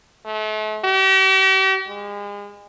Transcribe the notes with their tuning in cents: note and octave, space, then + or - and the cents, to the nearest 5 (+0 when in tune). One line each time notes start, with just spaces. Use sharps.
A3 -40
G4 -40
G#3 -35